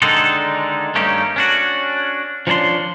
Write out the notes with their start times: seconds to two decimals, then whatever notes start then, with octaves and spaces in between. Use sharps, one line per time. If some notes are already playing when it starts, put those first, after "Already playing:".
0.02 D3 D#3 G#3 D4 D#4 A4
0.95 G2 A3 A#3 C#4 D#4 G4
1.36 C#4 D4 F#4
2.47 F3 C#4 D4 A5 C6